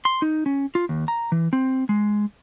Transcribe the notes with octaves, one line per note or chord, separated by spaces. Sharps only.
C6
D#4
C#4
F4
D#2
A#5
E3
C4
G#3